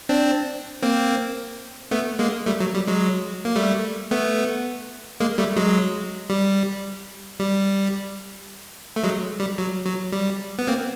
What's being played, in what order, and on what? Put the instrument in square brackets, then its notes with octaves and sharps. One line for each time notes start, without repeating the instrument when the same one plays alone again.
[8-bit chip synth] C4 D4
A#3 C4
A3 B3
G#3 A#3
G3 A3
F#3
G3
F#3 G#3
A#3
G3 A3
A3 B3
G#3 A#3
G3 A3
F#3 G#3
G3
G3
A3
F#3 G#3
G3
F#3
F#3
G3
B3
A#3 C4